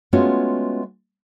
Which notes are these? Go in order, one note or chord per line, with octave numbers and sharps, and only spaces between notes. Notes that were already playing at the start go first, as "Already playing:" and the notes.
G#3 A3 B3 C#4 F4 F#4